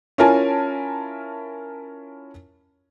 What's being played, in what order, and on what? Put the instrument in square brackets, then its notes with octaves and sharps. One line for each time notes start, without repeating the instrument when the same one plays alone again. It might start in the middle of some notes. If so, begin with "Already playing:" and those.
[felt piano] C#4 E4 F4 A#4 G#5 A5